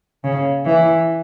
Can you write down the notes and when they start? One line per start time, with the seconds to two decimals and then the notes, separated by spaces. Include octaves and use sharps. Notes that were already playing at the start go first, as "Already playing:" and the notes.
0.24 C#3
0.65 E3